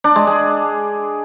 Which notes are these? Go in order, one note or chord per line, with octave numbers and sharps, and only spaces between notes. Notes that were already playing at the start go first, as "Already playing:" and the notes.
D4
G#3
G#4